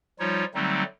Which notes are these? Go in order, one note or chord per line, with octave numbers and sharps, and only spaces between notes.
F3 G3 D#4 F4 C#5
D3 F#3 G3 A3 C4 D#4